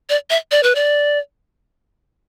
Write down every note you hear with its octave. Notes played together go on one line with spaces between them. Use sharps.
D5
E5
D5
B4
D5